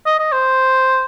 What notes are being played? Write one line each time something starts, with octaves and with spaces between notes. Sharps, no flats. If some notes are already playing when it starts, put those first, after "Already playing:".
D#5
D#5
C5